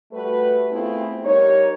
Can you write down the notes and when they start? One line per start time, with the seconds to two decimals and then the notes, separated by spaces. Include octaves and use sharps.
0.13 G3 A3 F#4 B4
0.71 A3 B3 C4 E4 F4 G#4
1.24 G3 D#4 A#4 C#5